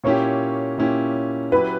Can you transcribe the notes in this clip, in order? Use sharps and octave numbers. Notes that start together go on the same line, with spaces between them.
A#2 A#3 C#4 E4 G4 C#5
A#2 A#3 C#4 E4 G4
F#3 C#4 E4 G4 B4